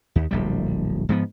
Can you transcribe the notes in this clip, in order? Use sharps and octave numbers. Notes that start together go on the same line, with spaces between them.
D#2
D1 A#1 G3
G#2 F3 B3